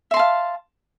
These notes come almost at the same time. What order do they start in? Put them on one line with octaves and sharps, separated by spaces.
E5 C6 A5 F5